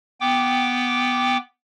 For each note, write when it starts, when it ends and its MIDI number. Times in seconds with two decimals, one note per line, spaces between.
0.21 1.37 59
0.21 1.37 79
0.21 1.37 86